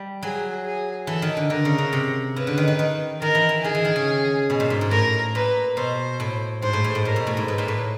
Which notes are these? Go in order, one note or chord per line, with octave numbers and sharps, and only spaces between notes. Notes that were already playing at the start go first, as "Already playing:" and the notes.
Already playing: G3
F#3 G#4
G#4
E3 A4
D#3
D3
D3 A#4
C#3
C#3
C3
C#3 B4
D3
D#3
D#3
D#3
D#3 A#4
E3
E3
D#3 G#4
E3
D#3
C#3
B2
A#2
G#2
G#2
A2 A#4
A#2 B4
B2 C5
A2
G#2 C5
A2
G#2
A2
A#2 A#4
B2
A2
G#2
A2 B4
A#2
A2